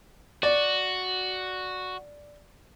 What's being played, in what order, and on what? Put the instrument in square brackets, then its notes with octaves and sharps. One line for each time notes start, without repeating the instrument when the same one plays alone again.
[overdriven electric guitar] F#4 [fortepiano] D5